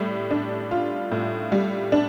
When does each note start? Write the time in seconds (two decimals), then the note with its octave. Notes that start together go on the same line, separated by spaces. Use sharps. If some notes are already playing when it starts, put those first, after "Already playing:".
Already playing: A2 G3
0.31 D4
0.71 F4
1.12 A2
1.52 G3
1.92 D4